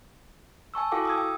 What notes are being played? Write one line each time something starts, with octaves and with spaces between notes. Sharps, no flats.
G#5 A5 C#6 E6
E4 F#4 A4 F5 G5 D6
D#6 E6 G#6
G5